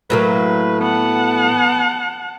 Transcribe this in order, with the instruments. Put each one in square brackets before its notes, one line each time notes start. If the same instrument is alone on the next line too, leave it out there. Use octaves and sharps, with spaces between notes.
[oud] A2 F#3 A#3 [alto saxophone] B4
[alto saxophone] B3 [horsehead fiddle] F#5 A5